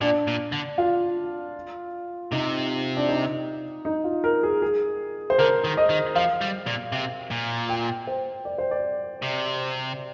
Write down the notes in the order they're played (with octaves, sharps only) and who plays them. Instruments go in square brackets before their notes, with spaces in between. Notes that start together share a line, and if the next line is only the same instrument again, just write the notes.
[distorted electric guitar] A#2 [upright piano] D4
[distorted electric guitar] A#2
D3
[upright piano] F4
[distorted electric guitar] C3 [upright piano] D#4
[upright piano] D4
D#4
D#4
F4
A#4
G#4
G#4
C5
[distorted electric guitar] D3 [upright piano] A#4
[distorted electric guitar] D#3
[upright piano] D#5
[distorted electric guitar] D#3
[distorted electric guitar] F3 [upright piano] F5
[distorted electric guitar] G3
A#2
C3
A#2
[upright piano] G5
C5
D5
C5
D5
[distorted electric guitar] C3